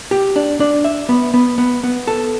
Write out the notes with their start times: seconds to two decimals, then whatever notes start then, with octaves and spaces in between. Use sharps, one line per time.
0.11 G4
0.36 D4
0.60 D4
0.84 E5
1.09 B3
1.34 B3
1.58 B3
1.84 B3
2.07 A4